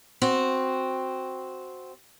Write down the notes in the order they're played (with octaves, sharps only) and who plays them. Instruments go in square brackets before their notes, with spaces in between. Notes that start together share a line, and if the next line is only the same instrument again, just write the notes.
[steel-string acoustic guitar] C4 F#4